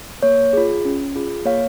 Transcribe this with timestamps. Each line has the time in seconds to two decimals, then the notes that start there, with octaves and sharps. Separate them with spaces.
0.23 A#3 C#5
0.53 F4 G#4
0.85 C#4
1.15 F4 G#4
1.45 A#3 C#5 F5